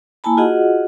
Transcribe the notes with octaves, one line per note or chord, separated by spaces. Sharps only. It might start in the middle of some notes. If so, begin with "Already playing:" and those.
A#3 E4 G#5 A5 B5
F4 F#4 G#4 D#5 F#5